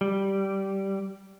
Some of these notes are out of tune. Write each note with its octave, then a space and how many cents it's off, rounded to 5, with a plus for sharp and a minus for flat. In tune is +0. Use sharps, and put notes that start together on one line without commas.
G3 -10